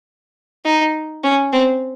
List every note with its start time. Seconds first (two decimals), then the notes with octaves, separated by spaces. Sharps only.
0.65 D#4
1.24 C#4
1.52 C4